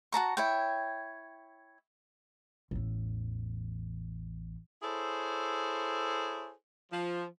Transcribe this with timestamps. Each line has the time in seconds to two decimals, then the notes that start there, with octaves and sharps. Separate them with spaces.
0.12 F#4 A5 A#5 C#6
0.37 E4 C#5 G5
2.71 A1 E2
4.83 E4 G#4 A4 C5 C#5
6.91 F3